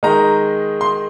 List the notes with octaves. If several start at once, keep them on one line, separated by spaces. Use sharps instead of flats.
D#3 G#3 D#4 A#5
C6